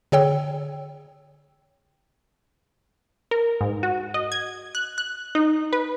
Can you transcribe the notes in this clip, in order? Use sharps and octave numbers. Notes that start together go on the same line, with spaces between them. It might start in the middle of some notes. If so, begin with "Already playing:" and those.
D3 G#4 C#5 G5 E6
A#4
G#2
F#4
D#5
G#6
F#6
F#6
D#4
B4